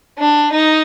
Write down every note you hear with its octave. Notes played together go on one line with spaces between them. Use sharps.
D4
D#4